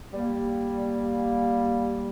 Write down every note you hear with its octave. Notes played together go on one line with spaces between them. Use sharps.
G3 A#3